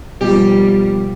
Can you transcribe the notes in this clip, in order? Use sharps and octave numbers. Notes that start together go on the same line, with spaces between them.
B2 F3 G3 A#3 G4